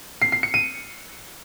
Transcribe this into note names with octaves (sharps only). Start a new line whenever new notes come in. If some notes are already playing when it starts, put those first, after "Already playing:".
C7
C7
C#7
D#7